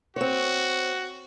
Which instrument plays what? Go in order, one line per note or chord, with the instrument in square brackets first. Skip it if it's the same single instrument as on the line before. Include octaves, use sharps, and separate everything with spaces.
[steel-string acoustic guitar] C4 C#5 [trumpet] F#4